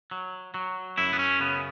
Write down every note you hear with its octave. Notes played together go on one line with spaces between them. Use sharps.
F#3
F#3
F#2 E4
B3
C#4
C#3 B3